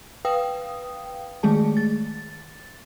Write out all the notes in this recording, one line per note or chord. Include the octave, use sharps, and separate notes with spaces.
B4 F5 G5 D#6
D#3 G#3 A3 G#4 A5
A6